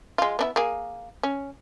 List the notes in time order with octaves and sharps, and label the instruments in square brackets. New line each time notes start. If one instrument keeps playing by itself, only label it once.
[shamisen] G#3 F4
B3 D4 E4
A#3 G#4
C#4